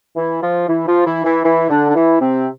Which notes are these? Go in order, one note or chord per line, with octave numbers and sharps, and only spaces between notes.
E3 E4
F3 F4
E3 E4
F3 F4
E3 E4
E3 E4
E3 E4
D3 D4
D4
E3 E4
C3 C4